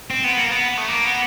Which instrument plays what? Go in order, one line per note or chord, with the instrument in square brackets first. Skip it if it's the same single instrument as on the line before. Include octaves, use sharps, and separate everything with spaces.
[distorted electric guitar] C4
B3
A#3
B3
A3
A#3
B3